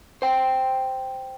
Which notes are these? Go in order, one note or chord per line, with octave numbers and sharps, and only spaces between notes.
C5 G5